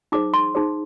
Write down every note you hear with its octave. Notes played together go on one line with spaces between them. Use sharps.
D#4 G#4 C5 D6
C6
D#4 G#4 C5